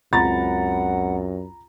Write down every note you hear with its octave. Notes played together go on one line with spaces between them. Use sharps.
C#2 F#2 C4 F#5 A#5 B5 A6